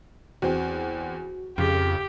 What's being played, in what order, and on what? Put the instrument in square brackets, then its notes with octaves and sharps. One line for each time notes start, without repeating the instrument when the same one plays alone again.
[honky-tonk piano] E2 C4 [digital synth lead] F#4
[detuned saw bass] F2 [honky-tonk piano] C#3 [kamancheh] G4